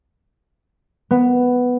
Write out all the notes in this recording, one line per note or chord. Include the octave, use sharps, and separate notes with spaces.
B3